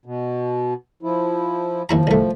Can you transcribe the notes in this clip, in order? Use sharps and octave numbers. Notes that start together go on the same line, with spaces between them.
B2
F3 E4
D#2 F3 E4 A#5
C2 A3